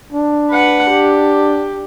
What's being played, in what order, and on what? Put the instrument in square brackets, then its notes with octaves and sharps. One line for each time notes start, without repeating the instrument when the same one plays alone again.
[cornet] D4
[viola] B4 F#5
G4